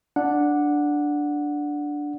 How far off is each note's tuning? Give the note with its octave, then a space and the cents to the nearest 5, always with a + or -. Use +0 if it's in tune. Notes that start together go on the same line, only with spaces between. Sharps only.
D4 +0 F#5 -10